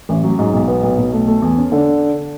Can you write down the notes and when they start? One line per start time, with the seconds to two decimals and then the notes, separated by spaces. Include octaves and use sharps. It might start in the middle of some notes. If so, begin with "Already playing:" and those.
0.09 A1
0.23 F#3
0.39 G#2
0.53 B1
0.68 B3
0.83 B1
0.98 B1
1.13 A3
1.28 A3
1.42 E2
1.57 C#4
1.72 D3